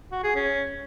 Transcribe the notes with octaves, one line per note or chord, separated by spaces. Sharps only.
F#4
G#4
C#4